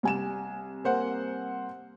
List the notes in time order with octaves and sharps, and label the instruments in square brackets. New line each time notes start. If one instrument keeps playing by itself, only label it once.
[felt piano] C2 G#5 E7
[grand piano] A#3 C5 F#5